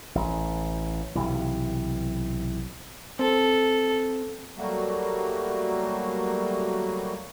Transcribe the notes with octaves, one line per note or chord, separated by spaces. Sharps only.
A1
B1 C3 E3
C4 A4
F#3 G3 A3 A#3 F#4